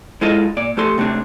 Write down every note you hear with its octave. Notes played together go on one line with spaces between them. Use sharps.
G#3 E4 F4 A4 D#5
A#2 D5
A3 G4 A4 C6
C3 A3 C4 D4